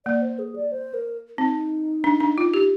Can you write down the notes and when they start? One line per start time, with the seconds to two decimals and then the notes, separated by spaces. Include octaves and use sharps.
0.06 A#3 D5
0.22 C5
0.39 G#4
0.56 D5
0.72 C5
0.94 A#4
1.38 C4 D#4
2.04 D4
2.20 D4
2.38 F4
2.54 G4